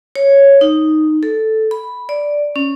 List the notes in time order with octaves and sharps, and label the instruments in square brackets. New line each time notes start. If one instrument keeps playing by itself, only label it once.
[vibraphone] C#5
D#4
A4
B5
D5
C#4